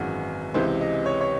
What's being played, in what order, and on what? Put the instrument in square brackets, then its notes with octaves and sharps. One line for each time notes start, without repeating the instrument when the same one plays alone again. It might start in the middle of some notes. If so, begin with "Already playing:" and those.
Already playing: [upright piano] G#1 F#2 E3 G#3 F#4
C#2 C3 E3 C5
D#5
C#5
C#5